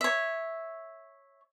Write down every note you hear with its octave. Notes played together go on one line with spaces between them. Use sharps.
C#5 E5